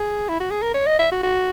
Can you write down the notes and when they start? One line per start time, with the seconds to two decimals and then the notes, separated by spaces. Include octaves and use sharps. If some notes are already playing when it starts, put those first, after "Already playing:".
Already playing: G#4
0.29 E4
0.40 F#4
0.51 G#4
0.62 A#4
0.75 C#5
0.87 D#5
0.99 E5
1.12 F#4
1.24 F#4